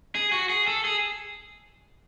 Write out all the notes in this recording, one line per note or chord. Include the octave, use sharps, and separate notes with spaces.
G#4
F#4
G#4
A4
G#4